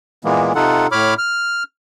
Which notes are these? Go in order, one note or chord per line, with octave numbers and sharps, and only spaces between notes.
A#2 E3 G#3 A#3 B3
C3 D#4 F4 A4 F#5
A2 C#5 B5 D6 F6
F6